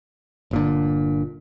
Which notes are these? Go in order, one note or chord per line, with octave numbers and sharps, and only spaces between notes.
G1 A#2 D3